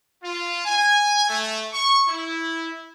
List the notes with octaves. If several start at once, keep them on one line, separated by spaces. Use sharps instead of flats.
F4
G#5
A3
C#6
E4